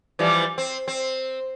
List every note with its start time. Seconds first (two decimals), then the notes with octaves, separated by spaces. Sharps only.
0.19 E3 F3 G3
0.58 C4
0.88 C4